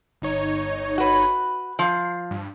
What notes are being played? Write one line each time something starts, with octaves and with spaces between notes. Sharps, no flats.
G1 D#4 C#5
F#4 B4
F3 C7
G2